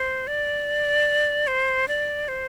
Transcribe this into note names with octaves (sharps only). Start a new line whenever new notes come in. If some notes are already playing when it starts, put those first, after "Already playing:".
Already playing: C5
D5
C5
D5
C5